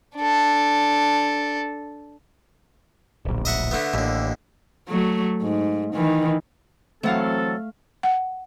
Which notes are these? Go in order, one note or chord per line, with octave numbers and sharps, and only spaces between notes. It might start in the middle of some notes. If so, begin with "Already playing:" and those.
D4 A4
D1 A#1
D#5 E5 F#5
D3 A3 B3
A1 D#2 D3
F#3 A3
G#2
D#3 E3
E3 F#3 A3 C4 A4 F5 F#5
F#5